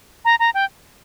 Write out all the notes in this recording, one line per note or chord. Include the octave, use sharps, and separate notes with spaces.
A#5
A#5
G5